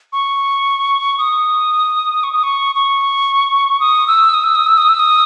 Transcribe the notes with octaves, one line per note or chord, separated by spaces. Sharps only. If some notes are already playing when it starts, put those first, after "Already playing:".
C#6
D#6
C#6
D#6
C#6
C#6
D#6
E6
D#6
E6
D#6
E6
D#6
E6
D#6